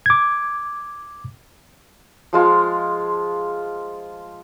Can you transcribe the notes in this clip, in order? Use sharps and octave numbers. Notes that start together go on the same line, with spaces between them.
D6 G#6
F3 G#3 F4